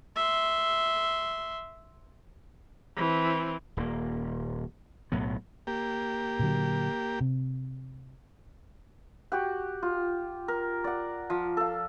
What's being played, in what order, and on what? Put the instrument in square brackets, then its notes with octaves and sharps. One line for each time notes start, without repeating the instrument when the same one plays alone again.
[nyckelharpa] E5 C6
[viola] E3 C4
[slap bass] D#1 A#3
B1 A2 F#3 B3
[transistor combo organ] A#3 G4
[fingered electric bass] A#2 D3 F#3
C3
[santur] F#4 G4 F#5
F4
A#4
D5 F#5
F3
A4 F5